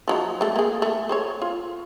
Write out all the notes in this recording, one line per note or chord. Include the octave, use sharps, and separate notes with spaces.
F3 F#3 D#4
G#3 A3
A#3 G#4
A3
G#4 C5 C#5
F4